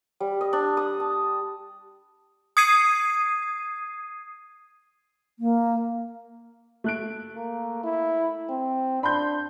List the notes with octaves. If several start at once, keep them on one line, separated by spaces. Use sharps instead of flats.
G3
D#5
D4
D#6
A5
D#6 G#6 C7 D#7
A#3
A3 F#6 D7
A#3
E4
C4
D4 B5 C6 G6